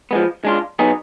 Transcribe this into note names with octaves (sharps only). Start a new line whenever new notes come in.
F3 G#3 B3
G#3 D4 F4
B2 F#3 B3 D#4 G#4